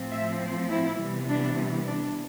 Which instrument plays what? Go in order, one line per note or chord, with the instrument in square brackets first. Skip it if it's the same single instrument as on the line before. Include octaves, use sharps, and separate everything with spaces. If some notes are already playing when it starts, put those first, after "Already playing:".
Already playing: [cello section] A2 F3 C4
E5
C5
E4
C3 E3 G3 B3
D4
D4